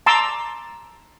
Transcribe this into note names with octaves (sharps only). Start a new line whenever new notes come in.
A5 A#5 C6 D6 E6